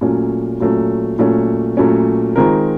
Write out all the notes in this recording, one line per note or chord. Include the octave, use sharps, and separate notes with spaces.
A#2 F#3 A3 C#4
A#2 F#3 A3 C#4
A#2 F#3 A3 C#4
A#2 F#3 A3 C#4
D#3 G#3 C4 F4 A#4